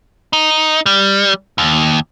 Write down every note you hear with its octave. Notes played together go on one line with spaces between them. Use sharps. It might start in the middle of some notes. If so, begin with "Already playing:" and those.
D#4
G3
D#2